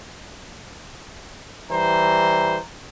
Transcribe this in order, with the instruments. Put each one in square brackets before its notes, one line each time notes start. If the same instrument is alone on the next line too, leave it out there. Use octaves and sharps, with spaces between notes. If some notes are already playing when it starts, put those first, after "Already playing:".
[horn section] E3 G3 C5 [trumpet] A#5